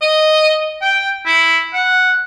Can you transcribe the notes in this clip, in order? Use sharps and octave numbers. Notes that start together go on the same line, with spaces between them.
D#5
G5
E4
F#5